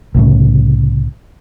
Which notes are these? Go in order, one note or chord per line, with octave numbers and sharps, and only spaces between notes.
C2 A2 C#3